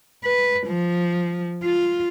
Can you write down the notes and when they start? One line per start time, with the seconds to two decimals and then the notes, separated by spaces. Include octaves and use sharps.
0.24 B4
0.67 F3
1.64 F4